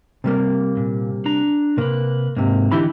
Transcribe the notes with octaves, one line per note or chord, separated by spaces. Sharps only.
C3 G3 A#3
A#2
D4 A#5
C3 A#3 B4
G#2 C3 A#3
D3 E3 D#4 E4 G4 B5